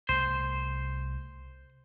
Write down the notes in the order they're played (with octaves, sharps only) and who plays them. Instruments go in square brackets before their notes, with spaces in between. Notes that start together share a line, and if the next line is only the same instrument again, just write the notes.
[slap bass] C2 A3 [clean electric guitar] C5